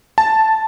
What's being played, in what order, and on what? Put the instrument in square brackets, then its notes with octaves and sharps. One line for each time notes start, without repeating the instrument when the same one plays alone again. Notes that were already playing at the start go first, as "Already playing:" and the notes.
[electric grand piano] A5